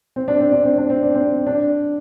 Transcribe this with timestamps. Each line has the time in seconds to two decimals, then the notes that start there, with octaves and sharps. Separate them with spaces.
0.16 C4
0.28 D4
0.40 C4
0.52 D4
0.65 C4
0.78 D4
0.90 C4
1.03 D4
1.15 C4
1.47 D4